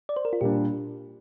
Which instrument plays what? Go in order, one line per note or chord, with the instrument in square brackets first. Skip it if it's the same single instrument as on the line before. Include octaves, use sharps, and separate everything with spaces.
[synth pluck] D5
C5
A#4
F4
[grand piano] A#2 G3 D4 [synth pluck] G4